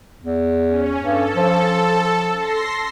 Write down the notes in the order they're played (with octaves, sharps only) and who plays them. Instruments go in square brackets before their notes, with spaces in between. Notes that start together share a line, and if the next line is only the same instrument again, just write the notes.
[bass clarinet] E2
[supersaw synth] C#4
[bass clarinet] G2 [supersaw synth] A4
[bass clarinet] F3
[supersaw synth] C6 A#6 C7